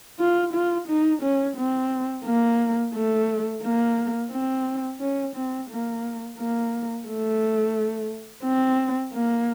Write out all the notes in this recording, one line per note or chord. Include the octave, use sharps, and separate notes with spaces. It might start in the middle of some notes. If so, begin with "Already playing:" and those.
F4
F4
D#4
C#4
C4
A#3
A3
A#3
C4
C#4
C4
A#3
A#3
A3
C4
A#3